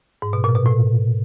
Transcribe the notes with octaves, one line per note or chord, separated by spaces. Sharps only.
G#2
B2
A#2
B2
A2